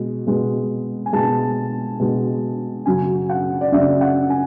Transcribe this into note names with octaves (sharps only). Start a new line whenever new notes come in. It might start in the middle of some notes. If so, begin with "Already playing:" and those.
Already playing: B2 G#3
B2 G#3
G#5
B2 G#3 A5
B2 G#3
F#2 C#3 F#3 G#5
F#5
D5
F#2 C#3 F#3 E5
F#5
G#5